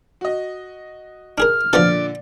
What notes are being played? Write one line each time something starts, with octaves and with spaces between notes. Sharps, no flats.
F#4 D#5
D4 G#4 A#4 F6
A#2 D3 F3 B3 A4 D5